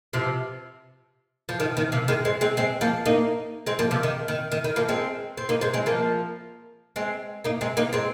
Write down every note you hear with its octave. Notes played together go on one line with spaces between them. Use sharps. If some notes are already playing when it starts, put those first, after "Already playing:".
C3 F3
F3
D#3
D#3
C3 F3
D#3 G#3
G#3 C4
G#3 C4
G#3 C4
F3 A#3
A#3 D#4
G#3 C4
F3 A#3
C3 F3
D#3
D#3
D#3
D#3
F3 A#3
G#3 C4
C4
A#3 D#4
G#3 C4
G#3 C4
F3 A#3
G#3 C4
A#3 D#4
G#3 C4
A#3 D#4
G#3 C4